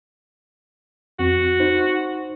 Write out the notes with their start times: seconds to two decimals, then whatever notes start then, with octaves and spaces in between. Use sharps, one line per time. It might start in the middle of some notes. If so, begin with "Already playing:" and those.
1.19 F2 C4 F#4
1.60 D#4 C5